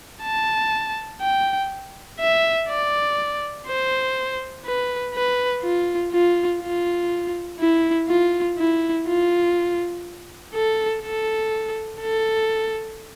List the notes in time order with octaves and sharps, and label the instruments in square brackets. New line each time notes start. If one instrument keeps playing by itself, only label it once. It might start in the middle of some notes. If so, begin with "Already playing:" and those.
[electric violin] A5
G5
E5
D5
C5
B4
B4
F4
F4
F4
E4
F4
E4
F4
A4
A4
A4